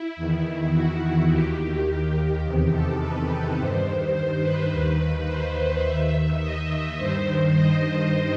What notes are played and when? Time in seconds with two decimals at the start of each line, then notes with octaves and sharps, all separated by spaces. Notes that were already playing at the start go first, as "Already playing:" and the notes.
Already playing: E4
0.16 E2 D#3
0.73 F#4
1.30 D#2 D#3 G4
2.43 E2 C3 D#3 G4
2.72 A4
3.00 B4
3.57 G2 D#3 C5
4.14 C5
4.42 B4
4.71 D#2 D#3 B4
5.27 C5
5.84 D#2 D#3 E5
6.41 D#5
6.98 G2 D#3 C5
7.54 D#5